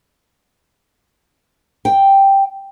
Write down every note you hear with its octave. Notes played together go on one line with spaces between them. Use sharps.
G5